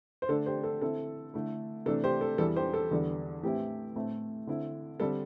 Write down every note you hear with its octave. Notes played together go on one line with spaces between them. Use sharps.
C5
D3 A3 D4 A4
G4 C5
A4
D3 C4 E4 A4
D3 A3 E4
C3 E3 A3 D4 A4
G4 C5
A4
E2 E3 G3 A4
G4 C5
A4
E2 D3 G3 D4
A2 E3 A3 C4 E4 G4
A2 A3 C4 E4
D3 C4 E4
D3 G3 C4 A4